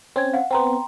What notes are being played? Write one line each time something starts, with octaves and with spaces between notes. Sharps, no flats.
C4 C#4 C#5 G#6
F5 F#5
B3 C4 G5 A#5 C6